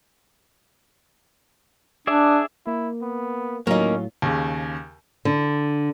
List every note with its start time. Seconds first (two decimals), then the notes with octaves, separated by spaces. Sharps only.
2.07 D4 G#4 D5 E5
2.67 A#3 E4
3.02 B3
3.67 A2 F#3 A#3 C#4 D#4 F4
4.22 D#2 C#3
5.25 D3